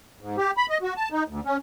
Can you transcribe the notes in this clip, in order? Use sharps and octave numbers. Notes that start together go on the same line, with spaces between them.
G#2
G4
B5
D#5
F#4
A5
D#4
D2
C#4